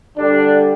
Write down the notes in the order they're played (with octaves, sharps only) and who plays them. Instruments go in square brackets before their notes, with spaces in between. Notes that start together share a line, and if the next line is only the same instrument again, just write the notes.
[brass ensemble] D3 G3 D4